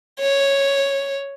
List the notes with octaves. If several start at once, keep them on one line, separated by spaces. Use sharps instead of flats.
C#5